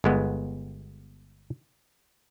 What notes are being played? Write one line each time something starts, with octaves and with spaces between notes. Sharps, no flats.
G1 G#3 B3